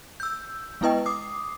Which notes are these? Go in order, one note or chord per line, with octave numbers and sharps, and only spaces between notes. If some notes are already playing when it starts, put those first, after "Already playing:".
E6 G6
G#3 B3 E4 B4 D#5 G5
D6 D#6 C7